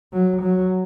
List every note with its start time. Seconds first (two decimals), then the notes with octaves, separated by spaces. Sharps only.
0.13 F#3
0.42 F#3